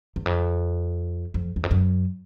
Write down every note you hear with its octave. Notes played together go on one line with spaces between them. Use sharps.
E2
F2
F2
E2
F2
F#2